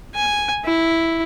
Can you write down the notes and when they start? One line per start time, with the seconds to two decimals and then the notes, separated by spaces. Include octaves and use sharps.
0.15 G#5
0.65 E4